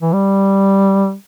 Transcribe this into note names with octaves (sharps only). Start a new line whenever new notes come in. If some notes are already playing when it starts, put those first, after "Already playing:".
E3
G3